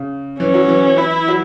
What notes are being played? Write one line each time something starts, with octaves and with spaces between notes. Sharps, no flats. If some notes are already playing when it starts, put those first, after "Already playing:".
Already playing: C#3
E3 C#4
F#3
E3
E4
F#3